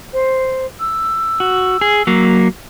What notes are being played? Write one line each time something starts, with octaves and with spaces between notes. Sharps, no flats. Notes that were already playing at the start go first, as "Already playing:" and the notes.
C5
E6
F#4
G#4
F#3 A#3